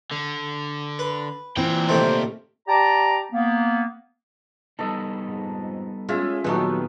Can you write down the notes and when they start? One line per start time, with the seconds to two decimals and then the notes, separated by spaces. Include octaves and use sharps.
0.11 D3
0.99 B4
1.57 A#2 E3 C4 G5
1.88 C3 D#3 A3 C5
2.68 G4 D5 A5 A#5
3.32 A#3 B3
4.79 G3 B3 D#4 A4 D#5
5.25 F2 G#2
6.09 G#3 C#4 F4 E5
6.44 A#2 D#3 F#3 G#3 A3 B3 D#4 G4